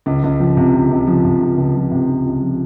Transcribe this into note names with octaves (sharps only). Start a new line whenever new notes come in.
C#2
C#2
F3
C3
C#2
C#2
F3
C3
C#2
C#2
F3
C3
C#2
C#2
F3